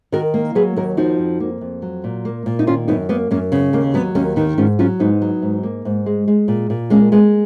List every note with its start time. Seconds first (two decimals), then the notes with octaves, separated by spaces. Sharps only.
0.12 D#3 F#4 A#4
0.34 A#3
0.55 F#3 G#4 B4
0.76 D#2 F#4 A#4
0.97 F3 D#4 F#4
1.18 F2
1.40 A#3
1.61 F2
1.82 F#3
2.04 A#2
2.25 A#3
2.46 A#2
2.59 D#4
2.67 D#3 C#4 F4
2.88 F#2 B3 D#4
3.09 A#3 B3
3.31 F#2 A#3 C#4
3.52 C#3 B3
3.73 D#2 A#3
3.94 F#3 B3
4.15 D#2 A#3 C#4
4.36 D#3 B3 D#4
4.58 G#2 C#4 F4
4.79 F#3 C#4 F4
4.99 G#2 B3 D#4
5.22 F#3
5.42 G#2
5.63 A#3
5.85 G#2
6.06 G#3
6.28 G#3
6.48 A#2
6.70 A#2
6.90 G#3 A#3 C#4
7.12 G#3 B3